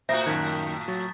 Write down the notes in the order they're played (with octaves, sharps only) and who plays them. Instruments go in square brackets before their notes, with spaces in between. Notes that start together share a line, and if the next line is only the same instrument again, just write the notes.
[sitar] A2 F#4 [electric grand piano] C5 [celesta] E5 A#6 [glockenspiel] A#5 D#6 G6
[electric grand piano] F#2 D#3 [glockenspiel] A5 B6 [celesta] G#6
[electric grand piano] F#3 [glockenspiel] C#6 A6